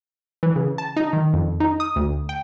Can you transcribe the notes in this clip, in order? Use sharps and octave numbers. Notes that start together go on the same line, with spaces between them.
E3
C#3
A5
D#4
D#3
F2
D#4
D#6
D2
G5